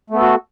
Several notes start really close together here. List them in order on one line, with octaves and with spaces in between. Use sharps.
A3 B3 A4 F#4